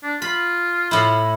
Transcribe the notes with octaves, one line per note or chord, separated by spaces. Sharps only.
D4
F4 B5
A2 E4